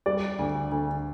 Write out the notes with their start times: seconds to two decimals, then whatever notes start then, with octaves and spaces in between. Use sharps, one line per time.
0.06 G3 D5
0.39 D2
0.71 D2